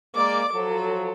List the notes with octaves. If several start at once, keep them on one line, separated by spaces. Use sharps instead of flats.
G#3 A#3 D5 D6
F3 F#3 A4